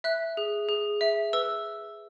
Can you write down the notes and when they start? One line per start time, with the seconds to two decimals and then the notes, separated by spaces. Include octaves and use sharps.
0.04 E5 F#6
0.37 G#4
0.69 G#4
1.01 E5
1.33 B4 E6